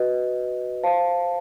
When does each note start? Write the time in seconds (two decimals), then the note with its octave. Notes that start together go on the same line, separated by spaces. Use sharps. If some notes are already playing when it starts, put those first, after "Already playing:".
Already playing: F#4 B4 D#5
0.83 C5 F5 A5